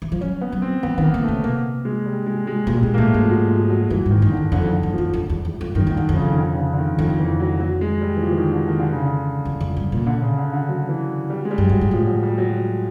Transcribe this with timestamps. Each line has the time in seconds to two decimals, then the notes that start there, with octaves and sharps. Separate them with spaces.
0.02 E3
0.12 F3
0.21 F#3 C#4
0.41 B3
0.52 F#3
0.62 C4
0.83 E3 B3
0.98 D#3 B3
1.03 A#3
1.14 D3
1.24 A3
1.28 C#3
1.44 C3 A#3
1.85 G#3
2.06 G3
2.27 G#3
2.47 G#3
2.67 A#2 G#3
2.77 G3
2.82 A#2 G#3
2.94 A#3
2.98 A2 A3
3.14 G#2 G#3
3.24 F3
3.29 F#3
3.50 F3
3.70 F#3
3.90 G2 E3
4.06 G#2
4.11 D#3
4.22 F#2 D#3
4.32 D3
4.37 E2
4.52 F2 D3
4.73 D3
4.83 F#2
4.93 E2 F3
5.13 F2
5.30 E2
5.45 E2
5.61 F2
5.75 F#2 D#3
5.87 F2 D#3
5.97 E2 D3
6.09 F2
6.16 C#3
6.32 D#3
6.37 D3
6.53 C#3
6.58 D3
6.73 D3
6.78 D#3
6.99 F2 D#3
7.20 E3
7.40 F#3
7.61 F#3
7.81 G#3
8.01 G3
8.17 E3
8.22 F3
8.32 E3
8.37 D#3
8.53 D3
8.68 D#3
8.80 D3
8.92 C#3
9.04 D3
9.45 E2
9.60 F2
9.77 G2
9.92 A#2
10.07 D3
10.22 C#3
10.37 D3
10.54 D3
10.69 F#3
10.89 E3
11.30 G3
11.45 G#3
11.51 G3
11.58 F#2
11.69 G2 F#3
11.81 G#2
11.91 A2 F3
12.07 F#3
12.23 G3
12.38 F#3